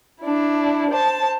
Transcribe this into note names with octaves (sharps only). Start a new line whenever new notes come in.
D4 E4
C5 A5